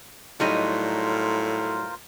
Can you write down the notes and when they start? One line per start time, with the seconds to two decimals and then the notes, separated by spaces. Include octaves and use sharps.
0.40 A2 F#3 G3 D#4 F4 A#4 C5